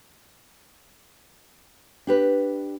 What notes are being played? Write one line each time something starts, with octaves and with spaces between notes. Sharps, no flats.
D4 G4 B4